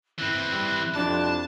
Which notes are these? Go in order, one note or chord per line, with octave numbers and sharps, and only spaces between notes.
E3 C4 E4 F#6
G3
F2 C3 D4 A5